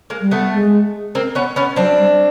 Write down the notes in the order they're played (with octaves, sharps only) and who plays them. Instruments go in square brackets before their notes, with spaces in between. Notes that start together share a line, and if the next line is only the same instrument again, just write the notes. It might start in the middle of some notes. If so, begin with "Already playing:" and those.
[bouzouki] G#3 A#3
[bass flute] G3
[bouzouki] A3 B3
[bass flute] G#3
[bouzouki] A#3 C4
B3 C#4
B3 C#4
[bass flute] F#3 [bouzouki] C4 D4
[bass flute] G3